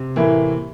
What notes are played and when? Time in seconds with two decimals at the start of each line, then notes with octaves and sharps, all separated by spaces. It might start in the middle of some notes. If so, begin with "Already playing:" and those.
Already playing: C3
0.16 A2 E3 A#3 E4